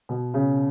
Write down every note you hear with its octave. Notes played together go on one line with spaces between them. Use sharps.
B2
C#3